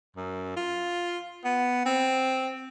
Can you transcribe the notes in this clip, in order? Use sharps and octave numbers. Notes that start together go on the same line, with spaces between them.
F#2
F4
B3
C4